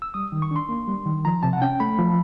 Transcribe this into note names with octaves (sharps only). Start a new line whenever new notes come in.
E6
G3 D#6
D#3
C#6
D4 C6
A#3
G3
D#3
F3 A#5
C3 A5
F#5
C#4 G5
A3 B5
F3